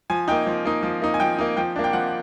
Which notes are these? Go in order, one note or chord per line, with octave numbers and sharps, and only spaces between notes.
F3 G#5
A#3 D#4 G5
F3
A#3 D#4
F3
A#3 D#4
G#5
F3 G5
A#3 D#4
F3 G5
A#3 D4
G5
F3 F#5